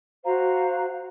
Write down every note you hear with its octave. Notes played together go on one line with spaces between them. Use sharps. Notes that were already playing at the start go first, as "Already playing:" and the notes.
F#4 C5 F5 A#5